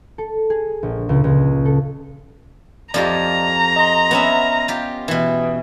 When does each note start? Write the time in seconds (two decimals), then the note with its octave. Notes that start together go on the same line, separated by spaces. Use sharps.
0.18 A4
0.50 G#4
0.83 A#1
1.09 C#2
1.24 C#2
1.65 A4
2.94 F2 F4 G4 D5 D#5 A#5
3.76 D#5 C6
4.11 B3 C#4 E5
4.68 F4 G4
5.08 B2 E3